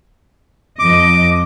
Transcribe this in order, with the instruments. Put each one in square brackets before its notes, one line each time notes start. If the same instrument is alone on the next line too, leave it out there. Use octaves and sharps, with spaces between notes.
[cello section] F2 D#5 [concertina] D6